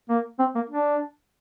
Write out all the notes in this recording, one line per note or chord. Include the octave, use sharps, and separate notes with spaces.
A#3
C4
A#3
D4